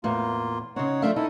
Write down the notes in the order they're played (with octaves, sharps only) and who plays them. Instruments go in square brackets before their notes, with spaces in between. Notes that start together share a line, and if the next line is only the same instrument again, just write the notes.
[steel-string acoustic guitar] E2 A2 [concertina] A#3 F4
[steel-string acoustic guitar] C#3 C4 [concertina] D#4 C#5 F#5
[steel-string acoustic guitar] F3 A3 D4 [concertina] E5 F5
[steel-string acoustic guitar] D#4 [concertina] E4 A4